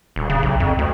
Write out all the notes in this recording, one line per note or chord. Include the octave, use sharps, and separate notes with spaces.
D#1
C#3
B1
F2
D2